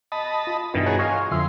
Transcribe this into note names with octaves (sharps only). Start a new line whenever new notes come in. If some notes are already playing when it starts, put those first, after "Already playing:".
D#5 A5 B5
F4
G2 B2 D#3 E3 D4
F#4 G#4 A#4 C#5
F4 C#5 D#5 F5 G#5
F2 D3 F3 E5 C6